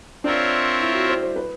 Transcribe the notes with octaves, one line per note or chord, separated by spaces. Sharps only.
C4 D4 F4 A#4 C#5 E5
E4
F#4
C5
C5
B4